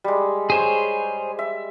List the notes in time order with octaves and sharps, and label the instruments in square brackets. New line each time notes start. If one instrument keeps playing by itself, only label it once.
[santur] G3 G#3
[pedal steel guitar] G#4 C5 C#5
[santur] E5